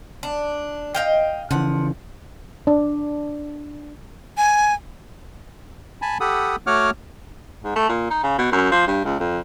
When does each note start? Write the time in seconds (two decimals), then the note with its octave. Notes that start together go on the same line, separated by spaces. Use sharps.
0.23 D4
0.95 D#5 F5 G5
1.51 C#3 E3 F3 F#5
2.67 D4
4.37 G#5
6.02 G#5 A5 B5
6.20 G4 A4 F#5 B5 D#6
6.67 A3 F#4 C#5 F#5 D6 F6
7.64 G#2
7.76 A3
7.89 A#2
8.10 D#4
8.23 C#3
8.38 B2
8.52 F#2
8.72 F3
8.87 G2
9.05 C#2
9.20 F2